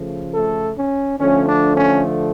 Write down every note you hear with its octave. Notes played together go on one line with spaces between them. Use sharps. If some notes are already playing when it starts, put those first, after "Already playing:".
Already playing: C#3 F3 A3
A3 A4
C#4
D3 F3 A3 C#4
D4
C#4